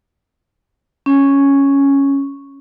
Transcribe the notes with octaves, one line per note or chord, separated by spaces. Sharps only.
C#4